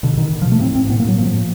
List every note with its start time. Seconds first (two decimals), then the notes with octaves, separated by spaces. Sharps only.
0.03 B2 D3
0.17 B2 D#3
0.31 B2
0.42 F3
0.46 B2
0.52 A3
0.60 A2 C4
0.75 A2 C4
0.89 A2 B3
1.00 A#3
1.05 A2 F#3
1.18 A2 F3
1.33 A2